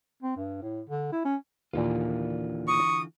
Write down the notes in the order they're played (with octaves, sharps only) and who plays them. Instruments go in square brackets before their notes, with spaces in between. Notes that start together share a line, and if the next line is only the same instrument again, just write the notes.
[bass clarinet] C4
G2
A2
D3
E4
C#4
[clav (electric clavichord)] D#2 A#2 [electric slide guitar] D3 E3 F4
[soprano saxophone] C#6 [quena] D#6